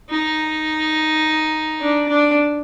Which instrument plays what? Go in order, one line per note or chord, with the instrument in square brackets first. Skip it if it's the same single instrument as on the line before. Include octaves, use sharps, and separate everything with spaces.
[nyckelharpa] D#4
D4
D4